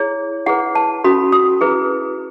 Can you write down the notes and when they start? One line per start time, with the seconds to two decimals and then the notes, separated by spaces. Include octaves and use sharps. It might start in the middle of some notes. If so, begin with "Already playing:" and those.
Already playing: E4 G#4 C#5
0.46 E4 G#4 B4 F#5
0.75 A5
1.04 C#4 F#4 A4 B5
1.32 D#6
1.61 E4 G#4 B4